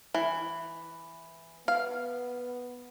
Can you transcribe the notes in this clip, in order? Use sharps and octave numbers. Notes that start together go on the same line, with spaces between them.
E3
B3 F5